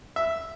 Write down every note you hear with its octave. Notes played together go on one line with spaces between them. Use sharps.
E5